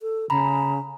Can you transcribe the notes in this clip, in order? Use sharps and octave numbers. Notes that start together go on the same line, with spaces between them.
A4
C#3 A#5 B5